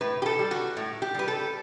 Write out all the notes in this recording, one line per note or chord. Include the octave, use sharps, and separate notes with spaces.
A2 B4
G4
A4
G3
F#4
A2
G4
G3 B4
A4